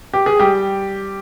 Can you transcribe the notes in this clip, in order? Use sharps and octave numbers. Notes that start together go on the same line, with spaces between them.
G4
G#4
G3 G4